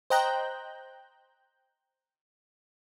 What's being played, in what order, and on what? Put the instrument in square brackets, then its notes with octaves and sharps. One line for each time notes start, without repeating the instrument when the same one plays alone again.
[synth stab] C5 D#5 G5 A#5 F#6 G6